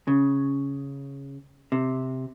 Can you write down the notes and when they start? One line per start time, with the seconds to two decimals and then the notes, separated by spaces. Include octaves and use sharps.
0.08 C#3
1.72 C3